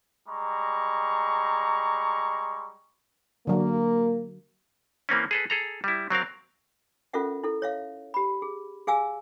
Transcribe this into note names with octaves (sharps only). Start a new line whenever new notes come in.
G3 G#3 A#5 C#6
D3 F#3 A#3
E3 A#3 C4 C#4
G#4 A4 B4
G#4 A4 A#5
G3 E4
F#3 C4 A#4 F5
C#4 F4 A4 A#4 E5 F#5
E4 A4
C#5 E5 F5
G4 B5
G#4
G#4 F5 G#5 E6